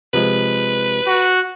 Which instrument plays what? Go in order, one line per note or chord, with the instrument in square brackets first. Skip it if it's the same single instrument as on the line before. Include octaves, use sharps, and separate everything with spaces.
[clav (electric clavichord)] C3 F3 G#3 [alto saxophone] B4
[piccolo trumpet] F#4